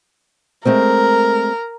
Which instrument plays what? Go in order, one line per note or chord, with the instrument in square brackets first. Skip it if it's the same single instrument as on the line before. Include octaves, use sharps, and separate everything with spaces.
[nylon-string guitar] G#3 A3 C4 [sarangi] A#4